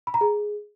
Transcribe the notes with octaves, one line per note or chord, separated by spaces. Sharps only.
B5
A#5
G#4